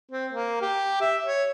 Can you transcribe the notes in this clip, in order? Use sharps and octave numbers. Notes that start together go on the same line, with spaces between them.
C4
A#3
G4
E5
C#5